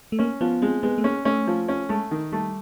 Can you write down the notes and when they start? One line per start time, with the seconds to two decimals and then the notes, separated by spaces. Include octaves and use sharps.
0.12 A3
0.19 A#3 C#4
0.41 F3 B3
0.62 G#3 C4
0.83 G#3 B3
0.98 A3
1.04 A#3 C#4
1.25 A3 C#4
1.47 F3
1.68 C#4
1.89 G#3 A3
2.11 D#3
2.32 G3 A3